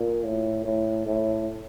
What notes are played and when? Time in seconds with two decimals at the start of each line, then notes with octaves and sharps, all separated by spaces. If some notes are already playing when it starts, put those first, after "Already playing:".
Already playing: A#2
0.24 A2
0.65 A2
1.06 A2